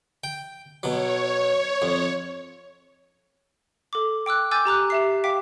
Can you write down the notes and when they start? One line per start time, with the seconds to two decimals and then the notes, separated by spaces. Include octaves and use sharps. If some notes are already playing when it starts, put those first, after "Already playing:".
0.24 G5
0.83 B2 F#3 C#5
1.82 F2
3.93 A4 D6
4.26 G5 D6 E6 F#6
4.51 G#5 D6 E6 G6 A6
4.65 G4 A#5 D6 F#6
4.90 G4 E5 C7
5.24 F5 G5 D6 B6